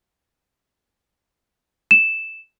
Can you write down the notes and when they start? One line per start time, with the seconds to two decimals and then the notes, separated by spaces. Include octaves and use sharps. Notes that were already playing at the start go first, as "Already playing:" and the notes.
1.91 E7